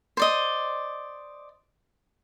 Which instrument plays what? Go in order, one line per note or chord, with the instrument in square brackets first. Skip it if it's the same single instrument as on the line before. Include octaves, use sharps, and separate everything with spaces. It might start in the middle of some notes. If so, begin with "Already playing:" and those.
[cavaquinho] C5 D5 D#5